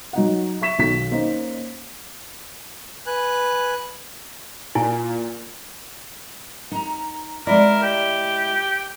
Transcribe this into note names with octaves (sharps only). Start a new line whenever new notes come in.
F#3 D#4 F#5
E5 C#6 B6 E7
B1 D#3 F#3 B6
A#3 C#4 D#4 C5
B4 G#5 F#6
A#2 E4 G#5
D#4 A#5
G#3 E4 A#4 D5
G4